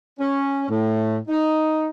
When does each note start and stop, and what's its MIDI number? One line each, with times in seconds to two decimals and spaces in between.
0.19 0.68 61
0.68 1.17 45
1.28 1.87 63